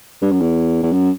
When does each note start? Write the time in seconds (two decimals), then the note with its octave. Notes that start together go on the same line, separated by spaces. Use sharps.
0.22 G2
0.31 F#2
0.41 E2
0.83 E2
0.92 F#2